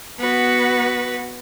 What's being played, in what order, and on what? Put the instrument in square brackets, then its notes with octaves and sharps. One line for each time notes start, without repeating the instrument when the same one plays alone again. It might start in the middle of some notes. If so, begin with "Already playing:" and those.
[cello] B3 F#4 [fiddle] B4